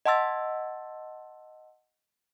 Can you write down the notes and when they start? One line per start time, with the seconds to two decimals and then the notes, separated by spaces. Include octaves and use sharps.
0.06 D#5 F#5 A5 C6 E6 A6